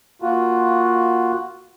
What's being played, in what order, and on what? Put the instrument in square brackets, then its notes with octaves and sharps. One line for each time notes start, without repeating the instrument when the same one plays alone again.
[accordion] A#3 F4 F#4